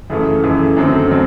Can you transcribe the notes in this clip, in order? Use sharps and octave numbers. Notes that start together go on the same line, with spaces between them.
F#2 C#3 E3 A3
F#2 C#3 E3 A3
F#2 D3 F#3 A3 C4
F#3 A3 C4